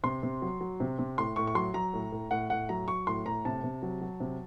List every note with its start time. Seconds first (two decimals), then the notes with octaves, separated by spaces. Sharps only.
0.04 C3 C6
0.23 C3
0.42 F#3
0.61 F#3
0.80 C3
0.99 C3
1.18 A2 C6
1.36 A2 C#6
1.47 C#6
1.55 F#3 C6
1.74 F#3 A#5
1.93 A2
2.12 A2
2.31 A2 F#5
2.50 A2 F#5
2.69 F#3 A#5
2.88 F#3 C#6
3.07 A2 C6
3.26 A2 A#5
3.45 C3 A5
3.64 C3
3.82 F#3
4.01 F#3
4.20 C3